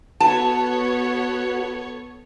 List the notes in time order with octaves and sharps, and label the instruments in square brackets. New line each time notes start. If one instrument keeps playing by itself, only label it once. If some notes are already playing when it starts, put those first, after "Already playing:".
[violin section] B3 A4 C#5 [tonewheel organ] F#4 B4 F#5 [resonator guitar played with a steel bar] A5